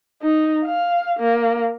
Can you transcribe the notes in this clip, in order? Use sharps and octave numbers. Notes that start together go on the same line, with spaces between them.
D#4
F5
A#3